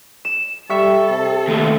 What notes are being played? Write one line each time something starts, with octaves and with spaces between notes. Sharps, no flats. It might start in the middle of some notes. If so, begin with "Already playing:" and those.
E7
G3 A4 E5 C#6
C3
D#2 A3